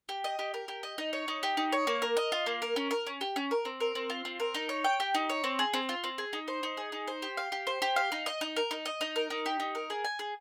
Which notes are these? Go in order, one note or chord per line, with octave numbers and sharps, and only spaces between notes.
G4
D#5
G4
A#4
G4
D#5
D#4
C#5
D#4
G4
D#4
C#5
A#3
A#4
D#5
F4
A#3
A#4
C#4
A#4
C#4
G4
C#4
A#4
C4
A#4
C4
F4
C4
A#4
D#4
C#5
G5
G4
D#4
C#5
C4
G#4
C4
F4
C4
G#4
D#4
C5
D#4
G#4
D#4
C5
G4
F5
G4
C5
G4
F5
D#4
D#5
D#4
A#4
D#4
D#5
D#4
A#4
D#4
G4
D#4
A#4
G#4
G#5
G#4